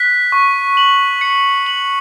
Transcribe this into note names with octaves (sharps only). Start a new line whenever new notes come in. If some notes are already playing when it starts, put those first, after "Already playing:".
Already playing: F#6 B6
C#6
F#7
C#7
F#7